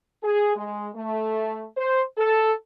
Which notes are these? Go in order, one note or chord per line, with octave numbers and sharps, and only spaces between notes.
G#4
G#3
A3
C5
A4